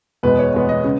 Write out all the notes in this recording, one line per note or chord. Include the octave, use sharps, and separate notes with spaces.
E2 B2 G#3 B3 B4
C#5
E2 B2 G#3 B3
D#5
C#3